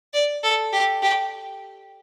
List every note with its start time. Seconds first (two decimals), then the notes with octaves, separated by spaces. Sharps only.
0.14 D5
0.43 A4
0.73 G4
1.02 G4